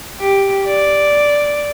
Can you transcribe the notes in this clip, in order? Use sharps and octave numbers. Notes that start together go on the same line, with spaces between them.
G4
D5